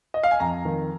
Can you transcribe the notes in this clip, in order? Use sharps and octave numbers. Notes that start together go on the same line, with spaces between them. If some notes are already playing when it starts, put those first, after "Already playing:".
D#5
F5
G#5
F2 A#5
D#3